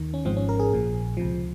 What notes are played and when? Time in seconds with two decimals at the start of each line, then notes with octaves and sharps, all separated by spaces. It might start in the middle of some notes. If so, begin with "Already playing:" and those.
Already playing: D#2 D#3
0.14 C#4
0.25 G#1 G#2 F3 C4
0.37 C#4
0.49 A#4
0.59 G#4
0.71 A#1 A#2 F3
1.17 C#2 C3 F3